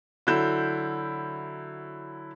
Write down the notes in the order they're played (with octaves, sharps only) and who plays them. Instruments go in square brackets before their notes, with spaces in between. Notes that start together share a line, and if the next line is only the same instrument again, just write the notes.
[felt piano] D3 F#3 E4 G6 E7